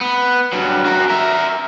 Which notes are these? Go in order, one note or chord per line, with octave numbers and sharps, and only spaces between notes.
B3
G2 F#3
F#4 A#4
A#4 E5